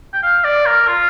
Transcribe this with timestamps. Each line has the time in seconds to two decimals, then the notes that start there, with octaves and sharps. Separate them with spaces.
0.13 G5
0.23 F5
0.44 D5
0.66 A#4
0.88 F4